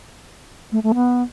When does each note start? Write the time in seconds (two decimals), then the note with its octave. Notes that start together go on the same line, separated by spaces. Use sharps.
0.72 A3
0.83 A3
0.95 B3